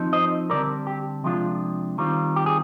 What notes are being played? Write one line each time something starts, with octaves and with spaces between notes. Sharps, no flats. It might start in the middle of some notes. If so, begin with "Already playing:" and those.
Already playing: F3 C4 D#4
C5 D#5
D3 G3 C4 A#4 D5
G4
C3 F3 G#3 D4 F4
D#3 G3 C4 F4
G4
G#4